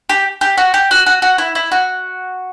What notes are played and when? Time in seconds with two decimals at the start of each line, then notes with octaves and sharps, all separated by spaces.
0.09 G4
0.41 G4
0.58 F#4
0.74 G4
0.91 F#4
1.06 F#4
1.22 F#4
1.38 E4
1.55 E4
1.72 F#4